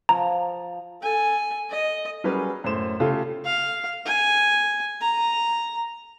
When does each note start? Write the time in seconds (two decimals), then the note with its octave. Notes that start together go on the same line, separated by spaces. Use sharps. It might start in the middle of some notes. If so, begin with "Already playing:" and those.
0.09 F3 A#5
1.02 A4 G#5
1.70 D#5
2.24 F#3 G3 C#4 G#4 A#4 B4
2.64 F#2 A2 C5 E7
3.00 C#3 A3 F4 G4 A4
3.45 F5
4.06 G#5
5.02 A#5